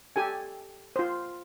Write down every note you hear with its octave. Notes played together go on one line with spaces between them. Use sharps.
G4 A4 G#5
F4 C5